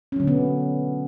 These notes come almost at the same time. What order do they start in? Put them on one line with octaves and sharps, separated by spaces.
C#4 F#3 D3 B2 B3